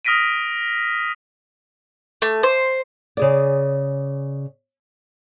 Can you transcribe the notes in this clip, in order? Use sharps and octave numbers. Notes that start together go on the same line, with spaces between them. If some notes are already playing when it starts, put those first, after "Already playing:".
D#6 F6 A#6 B6 D7 D#7
A3
C5
C#3 G#4 D5